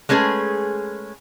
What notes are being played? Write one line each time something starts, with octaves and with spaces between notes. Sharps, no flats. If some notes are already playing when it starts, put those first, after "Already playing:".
G#3 A3 C#4 G#4 B4